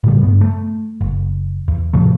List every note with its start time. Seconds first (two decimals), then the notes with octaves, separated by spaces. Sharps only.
0.04 A2 C#3 G3
0.23 G2 B3
0.41 A3
1.01 F#1
1.68 E2
1.93 A2 C3 F3 A3